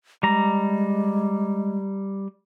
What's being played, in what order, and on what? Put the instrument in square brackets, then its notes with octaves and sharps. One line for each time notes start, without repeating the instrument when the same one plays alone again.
[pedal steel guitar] G3 A#5 [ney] G#3